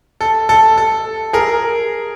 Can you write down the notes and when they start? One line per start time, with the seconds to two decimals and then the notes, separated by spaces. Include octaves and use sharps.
0.21 A4
0.49 A4
0.78 A4
1.33 G#4 A#4